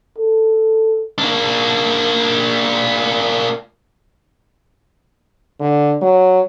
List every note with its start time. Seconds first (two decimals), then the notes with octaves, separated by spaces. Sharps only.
0.19 A4
1.18 A#3 D4
5.60 D3
6.02 F#3